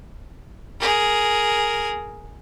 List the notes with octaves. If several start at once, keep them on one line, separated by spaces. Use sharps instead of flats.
G#4 A#4